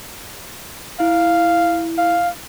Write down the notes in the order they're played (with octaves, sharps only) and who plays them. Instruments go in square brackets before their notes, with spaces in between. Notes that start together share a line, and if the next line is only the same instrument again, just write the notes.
[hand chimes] E4 [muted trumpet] F5
[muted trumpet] F5